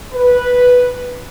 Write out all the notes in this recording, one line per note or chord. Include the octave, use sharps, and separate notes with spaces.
B4